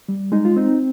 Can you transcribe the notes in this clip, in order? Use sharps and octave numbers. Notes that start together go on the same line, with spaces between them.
G3
G#3 D#4
F4
C4 D#4